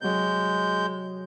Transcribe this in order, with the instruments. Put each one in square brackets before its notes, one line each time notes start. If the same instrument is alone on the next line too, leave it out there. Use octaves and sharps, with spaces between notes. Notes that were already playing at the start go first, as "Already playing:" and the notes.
[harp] C3 F#3 [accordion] G#3 G6